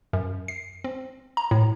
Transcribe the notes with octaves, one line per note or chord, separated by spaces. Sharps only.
F#2
C7
C4
A#5
A2